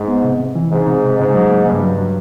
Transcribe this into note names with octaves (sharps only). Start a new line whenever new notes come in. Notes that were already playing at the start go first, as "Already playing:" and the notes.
Already playing: G#2
B3
C3
C3
E3
G#2 C3
C3
C3
G#2 C#3
F#3
A#3
G2 C#3
F#3
F#3